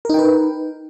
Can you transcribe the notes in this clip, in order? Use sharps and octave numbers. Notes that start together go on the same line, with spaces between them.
D#4 A#4 B4 G5